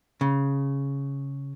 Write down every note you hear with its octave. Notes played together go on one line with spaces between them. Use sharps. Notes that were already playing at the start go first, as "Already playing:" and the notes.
C#3